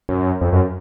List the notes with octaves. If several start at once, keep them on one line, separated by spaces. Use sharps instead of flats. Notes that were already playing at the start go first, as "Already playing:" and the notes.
F#2
F2
F#2